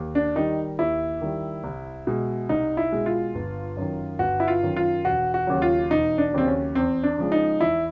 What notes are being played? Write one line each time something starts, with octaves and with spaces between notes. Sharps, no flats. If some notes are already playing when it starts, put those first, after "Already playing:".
Already playing: D#2
D4
D#3 G3 D#4
D#2 E4
D#3 G3
C2
B2 G#3
C2 D#4
E4
B2 G#3
F4
G1
F#2 D#3
G1 F#4
E4
F4
F#2 D#3
F4
E1 F#4
F#4
D#2 C#3 F#3
F4
E1 D#4
D4
D#2 C#3 F#3 C4
C#4
E2 C4
D4
C#3 F3 G#3
D#4
E2 E4